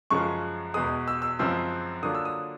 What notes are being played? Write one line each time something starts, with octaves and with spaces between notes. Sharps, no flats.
F#2 C#3 F3 G#3 C#6
E2 B2 G#3 D#6
E6
E6
F#2 C#3 F3 G#3 C4 E6
D3 F#3 A#3 D4 F4 D#6
E6
D#6